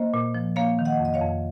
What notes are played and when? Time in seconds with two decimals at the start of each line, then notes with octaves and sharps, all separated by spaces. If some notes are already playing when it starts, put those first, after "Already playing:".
Already playing: A#3 C5 D#5
0.14 A#2
0.35 F3
0.56 A#3 C#5 F5
0.79 D#3
0.85 D#5 F#5
1.00 F2
1.05 D#5
1.14 C#5 F5
1.21 F2